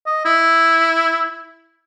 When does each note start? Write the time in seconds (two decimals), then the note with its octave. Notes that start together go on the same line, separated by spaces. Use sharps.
0.07 D#5
0.25 E4